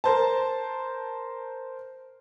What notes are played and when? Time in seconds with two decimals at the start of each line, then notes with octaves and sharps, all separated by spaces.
0.04 A#4 C5 A5